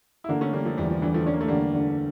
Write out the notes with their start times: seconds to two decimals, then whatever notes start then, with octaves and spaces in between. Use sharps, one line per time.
0.24 E4
0.29 D3 A#3 D4
0.41 A3 C#4
0.53 D3 G3 A#3
0.65 F3 A3
0.77 E2 E3 G3
0.90 F3
1.01 D3 E3 G3
1.14 F3 A3
1.26 C#4 D4
1.34 A#3
1.41 A3
1.48 D3 G3 A#3
1.74 D3